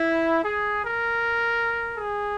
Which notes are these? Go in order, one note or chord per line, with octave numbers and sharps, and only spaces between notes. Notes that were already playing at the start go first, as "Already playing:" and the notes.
Already playing: E4
G#4
A#4
G#4